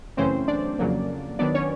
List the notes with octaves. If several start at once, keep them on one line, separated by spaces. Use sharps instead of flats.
F#2 C#3 E3 A3 C4 C#4 C5
D4 D5
F2 C#3 F#3 A#3
D#3 F#3 B3 D4 D5
C#4 C#5